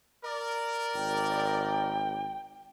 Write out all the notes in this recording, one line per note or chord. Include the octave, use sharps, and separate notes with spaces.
A#4 D5
G#1 G5